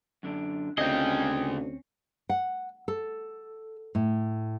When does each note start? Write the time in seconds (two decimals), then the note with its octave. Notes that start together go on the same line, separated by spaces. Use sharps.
0.23 F#2 D3 D4
0.78 D2 C#3 C4 C#4 G#4 D#5 G5
2.29 F#5
2.88 A4
3.95 A2